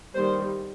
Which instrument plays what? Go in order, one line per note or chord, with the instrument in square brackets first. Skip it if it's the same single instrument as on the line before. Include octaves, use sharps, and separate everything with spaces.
[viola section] D#3 G3 A#3 C5